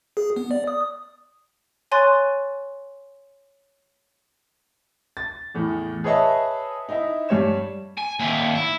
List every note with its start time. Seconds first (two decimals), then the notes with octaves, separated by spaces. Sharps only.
0.17 G#4
0.36 B3
0.51 D5
0.67 D#6
1.91 C#5 G#5 C6 C#6 F#6 A6
5.17 A6
5.54 E2 A2
6.04 G#4 B4 C#5 D#5 E5 A5
6.89 D#4 E4 E5
7.29 G2 G3 C#5 E7
7.98 G#5
8.20 D#2 E5
8.55 E4